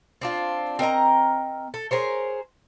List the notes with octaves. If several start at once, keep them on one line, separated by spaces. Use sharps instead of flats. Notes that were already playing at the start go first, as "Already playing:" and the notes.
C4 D4 F4
C4 A#4 D#5 A#5
A4
G#4 A#4 C5 C#5